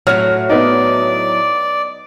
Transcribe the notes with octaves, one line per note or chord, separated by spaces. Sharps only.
A2 F#3 F6
B3 D#4 D5